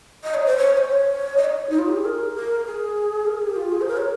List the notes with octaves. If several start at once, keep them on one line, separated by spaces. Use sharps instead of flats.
D#5
C#5
C5
C#5
C5
C#5
D#5
C#5
D#4
F4
G4
G#4
A#4
A#4
G#4
A#4
G#4
G4
F4
G#4
C5
A#4
C#5